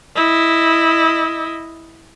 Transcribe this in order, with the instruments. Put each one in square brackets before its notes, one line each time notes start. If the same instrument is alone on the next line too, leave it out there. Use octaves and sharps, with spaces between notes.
[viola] E4 D#5